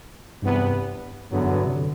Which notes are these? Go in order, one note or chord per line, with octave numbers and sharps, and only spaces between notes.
E2 G2 C3 E3 B3
E2 G2 D3 F#3 B3
F#2
G2
C3
D3